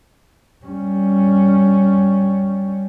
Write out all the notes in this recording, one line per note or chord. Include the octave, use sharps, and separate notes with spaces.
G3 C#4